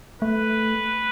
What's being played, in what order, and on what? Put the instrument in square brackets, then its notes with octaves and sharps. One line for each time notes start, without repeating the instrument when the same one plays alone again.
[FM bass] A3 [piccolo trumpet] B4